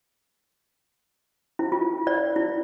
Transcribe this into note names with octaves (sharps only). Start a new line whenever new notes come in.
E4
F4
D5
E4